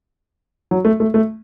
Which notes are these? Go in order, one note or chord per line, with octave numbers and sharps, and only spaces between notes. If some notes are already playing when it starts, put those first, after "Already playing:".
F#3
A3
A3
A3